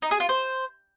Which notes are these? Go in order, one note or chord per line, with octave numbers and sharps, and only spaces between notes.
D#4
G#4
F4
C5